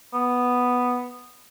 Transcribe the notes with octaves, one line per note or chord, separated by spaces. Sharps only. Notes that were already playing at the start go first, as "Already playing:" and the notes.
B3